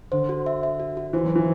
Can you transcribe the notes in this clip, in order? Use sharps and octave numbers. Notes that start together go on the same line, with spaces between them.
D3 C5
F#4
E5
E5
F#4
F#4
E3 C5
F#3
C5
E3